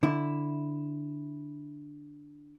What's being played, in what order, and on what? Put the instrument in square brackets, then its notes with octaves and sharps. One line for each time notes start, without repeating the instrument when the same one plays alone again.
[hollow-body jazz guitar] D3 E4